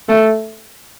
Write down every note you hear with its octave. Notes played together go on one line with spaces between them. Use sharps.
A3